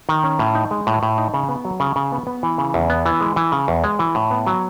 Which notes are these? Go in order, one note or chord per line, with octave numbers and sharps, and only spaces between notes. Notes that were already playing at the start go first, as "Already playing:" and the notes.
D#3
C#4
A2
D#4
G#3
A2
A2
D#4
C#3
B3
F#3
C#3
C#3
B3
B3
E3
C#3
E2
B3
E3
G#3
E3
C#3
E2
G#3
E3
A2
B3
F#3